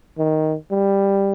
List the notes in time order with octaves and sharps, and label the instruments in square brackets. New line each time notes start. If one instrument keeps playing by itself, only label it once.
[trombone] D#3
G3